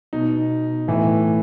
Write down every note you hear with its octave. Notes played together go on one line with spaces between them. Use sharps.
B2 D#4
A2 E3